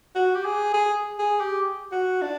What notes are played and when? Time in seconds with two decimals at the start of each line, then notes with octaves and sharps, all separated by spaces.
0.15 F#4
0.35 G4
0.45 G#4
0.74 G#4
1.19 G#4
1.40 G4
1.92 F#4
2.22 D4